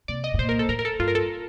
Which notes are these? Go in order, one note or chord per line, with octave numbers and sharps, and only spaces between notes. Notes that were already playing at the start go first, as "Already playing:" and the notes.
C3 D5
D#5
A2
A#2 C5
A#4
A4
A2 A#4
A#4
A4
G2 F4
A#4
A4